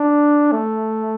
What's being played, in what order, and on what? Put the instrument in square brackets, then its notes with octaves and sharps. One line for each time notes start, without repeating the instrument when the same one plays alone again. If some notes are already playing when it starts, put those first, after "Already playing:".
Already playing: [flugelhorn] D4
A3